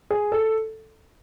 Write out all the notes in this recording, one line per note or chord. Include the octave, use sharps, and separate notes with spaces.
G#4
A4